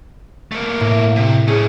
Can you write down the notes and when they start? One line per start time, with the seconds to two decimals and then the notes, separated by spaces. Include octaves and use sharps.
0.52 A3 A#3
0.80 A2
1.16 C3
1.48 A3 C#4 G#4